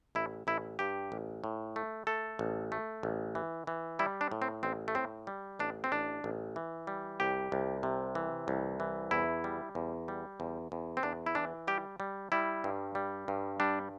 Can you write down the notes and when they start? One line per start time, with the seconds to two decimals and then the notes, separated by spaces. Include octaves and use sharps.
0.15 A1 E4
0.47 A1 E4
0.79 G2 G4
1.12 A1
1.44 A2
1.76 A3
2.07 A3 A4
2.39 A1
2.72 A3
3.03 A1
3.35 E3
3.67 E3
3.99 G3 E4
4.21 D4
4.31 A2
4.42 C4
4.63 A1 C4
4.88 A3
4.95 A2 C4
5.27 G3
5.59 A1 D4
5.84 C4
5.92 A1 D4
6.24 A1
6.56 E3
6.87 G3
7.20 C2 G4
7.52 C2
7.83 C3
8.15 E3
8.48 C2
8.80 E3
9.11 E2 E4
9.44 G3
9.75 E2
10.08 G3
10.40 E2
10.72 E2
10.97 C4
11.03 E2 D4
11.26 E4
11.35 E3 D4
11.67 G3 G4
12.00 G3
12.32 G3 E4
12.64 G2
12.95 G3
13.28 G2
13.60 G3 D4